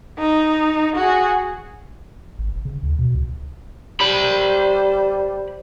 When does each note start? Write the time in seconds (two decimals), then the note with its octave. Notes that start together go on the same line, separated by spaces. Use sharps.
0.18 D#4
0.96 F#4 G#4
2.39 G#1
2.53 E1
2.65 C#3
2.83 D2
2.99 B2
3.15 C#2
4.00 G3 C5 B5